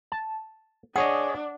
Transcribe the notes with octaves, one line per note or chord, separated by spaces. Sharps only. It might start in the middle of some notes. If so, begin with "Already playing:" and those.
A5
D4 G#4 C#5 D#5 F#5